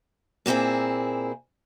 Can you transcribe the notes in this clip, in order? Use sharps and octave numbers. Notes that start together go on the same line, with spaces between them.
A#2 A#3 C4 E4 G#4